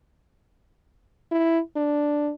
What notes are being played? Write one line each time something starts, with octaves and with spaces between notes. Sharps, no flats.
E4
D4